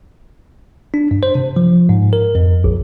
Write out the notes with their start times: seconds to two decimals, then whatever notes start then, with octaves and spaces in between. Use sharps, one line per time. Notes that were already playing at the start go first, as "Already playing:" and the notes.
0.94 D4
1.11 G2
1.23 C5
1.35 C3
1.56 F3
1.89 G#2
2.13 A#4
2.35 F2
2.64 A#1